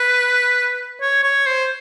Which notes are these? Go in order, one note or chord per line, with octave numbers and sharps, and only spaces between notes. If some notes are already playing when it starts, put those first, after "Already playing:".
Already playing: B4
C#5
C#5
C5